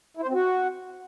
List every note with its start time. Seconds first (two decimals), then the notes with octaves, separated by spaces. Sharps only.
0.17 E4
0.22 C5
0.28 C4
0.33 F#4